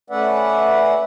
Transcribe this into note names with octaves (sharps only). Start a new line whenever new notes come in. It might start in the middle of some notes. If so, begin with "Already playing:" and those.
A3 C#4 B4 D5 E5 F#5